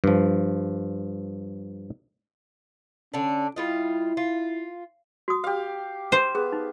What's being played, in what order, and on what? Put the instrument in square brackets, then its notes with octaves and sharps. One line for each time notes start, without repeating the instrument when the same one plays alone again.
[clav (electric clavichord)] G2 F3
[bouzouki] D3 D4 [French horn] C#4
[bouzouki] G3 F4 D#5 [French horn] E4
[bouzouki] F4
[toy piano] F#4 D#6
[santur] G4 F5
[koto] C5
[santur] B3 [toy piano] G#4
[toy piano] D#4